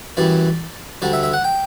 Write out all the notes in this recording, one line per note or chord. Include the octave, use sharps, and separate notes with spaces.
F#2 E3 G3 D5
D2 D3 G3 D5
E5
E5
F#5
G5